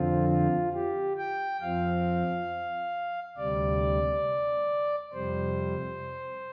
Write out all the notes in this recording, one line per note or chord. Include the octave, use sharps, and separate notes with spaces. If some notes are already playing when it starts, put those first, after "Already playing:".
Already playing: F2 D3 F3 C4 F4
F4
G4
G5
F2 F3 C4 F5
D2 C3 G3 D5
F2 C3 G3 C5